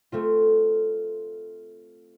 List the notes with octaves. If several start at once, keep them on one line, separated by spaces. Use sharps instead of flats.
A3 C4 F4